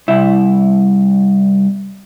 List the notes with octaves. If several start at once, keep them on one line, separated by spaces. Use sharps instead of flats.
C2 E4